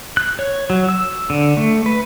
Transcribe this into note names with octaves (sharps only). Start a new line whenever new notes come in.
F#6
C#5
F#3
E6
D3
A3
B4